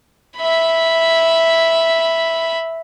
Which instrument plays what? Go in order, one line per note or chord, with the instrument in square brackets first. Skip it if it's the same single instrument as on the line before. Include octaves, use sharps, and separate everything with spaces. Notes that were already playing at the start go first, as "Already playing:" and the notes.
[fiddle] E5 B5